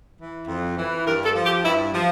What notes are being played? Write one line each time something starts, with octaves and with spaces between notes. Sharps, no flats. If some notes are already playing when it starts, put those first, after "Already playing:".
E3
F2
E3
G2 A#4
A4
F3
G4
G2 E4
F3